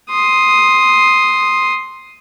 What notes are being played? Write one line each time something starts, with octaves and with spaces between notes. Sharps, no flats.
C6 D#6